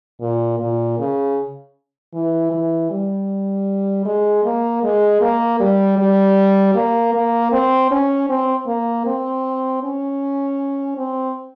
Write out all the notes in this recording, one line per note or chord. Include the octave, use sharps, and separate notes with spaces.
A#2
A#2
C#3
E3
E3
G3
G#3
A#3
G#3
A#3
G3
G3
A#3
A#3
C4
C#4
C4
A#3
C4
C#4
C4